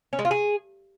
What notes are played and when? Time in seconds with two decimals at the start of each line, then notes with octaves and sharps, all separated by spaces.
0.13 C#4
0.19 G#3
0.25 F4
0.31 G#4